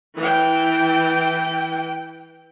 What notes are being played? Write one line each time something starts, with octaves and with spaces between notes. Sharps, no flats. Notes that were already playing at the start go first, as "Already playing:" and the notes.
E3 G5